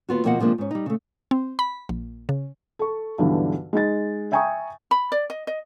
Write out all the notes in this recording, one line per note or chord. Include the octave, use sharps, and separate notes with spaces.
D#2 B3 F4 F#4
D#2 B2 F3 A#3 D#5 F#5
C3 F3 G#3 A#3 D4
G#2 C#4
G3 D#4
C#3 A3
C4
B5
A#1
C#3
A4 C#6
B1 G2 D3 E3
G#3 D#4 A6
E5 G5 G#5 A#5 C#6 D#6
B5
D5
D#5
D#5